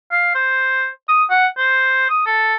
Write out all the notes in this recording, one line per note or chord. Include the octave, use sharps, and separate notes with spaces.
F5
C5
D#6
F#5
C5
D#6
A4